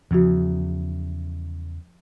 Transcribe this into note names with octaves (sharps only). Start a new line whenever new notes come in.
E2 C#3 F3 F#4